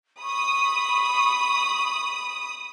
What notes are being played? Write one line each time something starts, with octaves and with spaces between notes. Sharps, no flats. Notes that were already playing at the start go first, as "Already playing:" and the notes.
B5 C#6 D#6